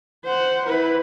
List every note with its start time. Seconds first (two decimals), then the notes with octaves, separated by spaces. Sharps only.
0.25 C5 F#5
0.66 E4 B4